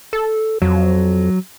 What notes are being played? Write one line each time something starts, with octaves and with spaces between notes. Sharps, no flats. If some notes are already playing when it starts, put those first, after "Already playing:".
A4
F2 F#3